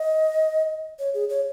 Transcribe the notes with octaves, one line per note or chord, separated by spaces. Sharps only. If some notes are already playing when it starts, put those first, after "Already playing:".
Already playing: D#5
C#5
G#4
C#5